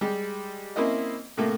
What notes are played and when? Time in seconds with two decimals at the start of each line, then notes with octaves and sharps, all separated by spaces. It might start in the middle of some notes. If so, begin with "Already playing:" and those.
0.01 G3 G#3 G4
0.76 A#3 C4 C#4 E4 A#4 D#5
1.37 A2 C3 A3 A#3